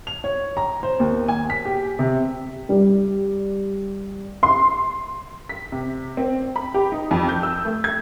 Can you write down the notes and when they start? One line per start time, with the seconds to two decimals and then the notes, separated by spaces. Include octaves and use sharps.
0.07 F7
0.24 C#5
0.57 A#5
0.83 C5
1.00 D#2
1.28 G#5
1.50 B6
1.65 G4
1.99 C3
2.69 G3
4.43 C6
5.49 B6
5.72 C3
6.17 C4
6.56 B5
6.74 G4
6.92 D#4
7.11 F2
7.29 G6
7.43 E6
7.65 A3
7.84 G#6